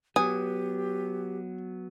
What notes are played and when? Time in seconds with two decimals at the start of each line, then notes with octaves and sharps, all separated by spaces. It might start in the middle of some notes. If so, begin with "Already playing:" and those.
0.16 F#3 B3 G4 G#5 D#6